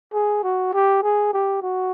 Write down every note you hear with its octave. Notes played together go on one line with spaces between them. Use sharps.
G#4
F#4
G4
G#4
G4
F#4